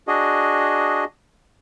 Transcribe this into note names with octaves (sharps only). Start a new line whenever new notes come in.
D4 F#4 G#4 D#5